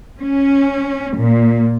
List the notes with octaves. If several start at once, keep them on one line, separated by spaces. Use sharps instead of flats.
C#4
A#2